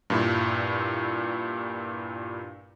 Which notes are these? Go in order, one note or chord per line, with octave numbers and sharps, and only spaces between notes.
G2 A#2 E4